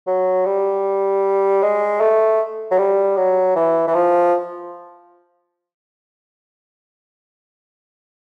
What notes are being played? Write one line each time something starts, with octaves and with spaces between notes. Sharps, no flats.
F#3
G3
G#3
A3
F#3
G3
F#3
E3
E3
F3